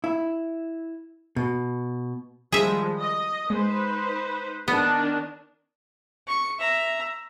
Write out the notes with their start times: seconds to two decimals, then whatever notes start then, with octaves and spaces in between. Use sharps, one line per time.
0.04 E4
1.36 B2
2.52 D#3 F3 G3 G#3 G#4 E5
3.00 D#5
3.50 G#3 D#4 B4 C5
4.68 D#3 B3 D4
6.27 C#6
6.59 E5 A#5